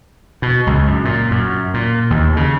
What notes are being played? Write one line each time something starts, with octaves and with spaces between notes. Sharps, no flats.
B2
C#2
F#2
A#2
F#2
A#2
D#2
C#3